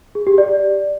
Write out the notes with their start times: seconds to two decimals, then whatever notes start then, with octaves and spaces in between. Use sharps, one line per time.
0.15 G#4
0.27 G4
0.38 D5